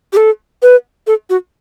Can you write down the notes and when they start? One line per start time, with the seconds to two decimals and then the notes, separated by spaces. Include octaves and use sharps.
0.13 G4
0.17 A4
0.62 B4
1.07 A4
1.30 F#4